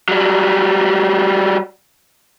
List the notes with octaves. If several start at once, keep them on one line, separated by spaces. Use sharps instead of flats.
F#3 G3